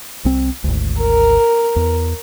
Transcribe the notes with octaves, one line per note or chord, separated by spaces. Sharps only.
C2 C4
G#1 D2
A#4
E2